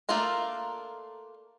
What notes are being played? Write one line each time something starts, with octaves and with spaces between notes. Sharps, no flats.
A3 A#3 D4 F4 A#4